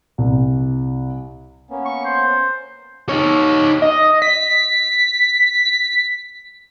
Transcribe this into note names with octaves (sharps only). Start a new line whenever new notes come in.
C2
A#3 B3 C#4
C#6
C5
D#4 C#5
D#5
B6